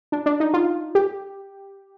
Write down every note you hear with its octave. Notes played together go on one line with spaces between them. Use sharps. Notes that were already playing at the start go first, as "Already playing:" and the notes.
D4
D4
D#4
F4
G4